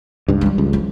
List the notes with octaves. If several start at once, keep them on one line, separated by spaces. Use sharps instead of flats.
C#2 G2
E3 G3
C#2
E3 F3